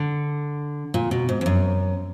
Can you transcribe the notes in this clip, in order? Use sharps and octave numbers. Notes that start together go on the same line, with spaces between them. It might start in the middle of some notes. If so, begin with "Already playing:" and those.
Already playing: D3
A#2
B2
G#2
F2
F#2